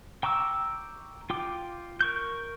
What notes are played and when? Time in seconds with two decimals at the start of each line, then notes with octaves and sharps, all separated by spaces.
0.23 G5 A#5 C#6 D6 E6
1.30 F4 G5 D6
2.01 A#4 C#6 G6